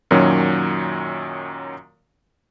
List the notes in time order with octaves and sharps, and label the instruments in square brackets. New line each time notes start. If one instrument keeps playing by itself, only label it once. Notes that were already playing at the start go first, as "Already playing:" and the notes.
[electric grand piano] F#2 A#2 D#3 F#3 C#4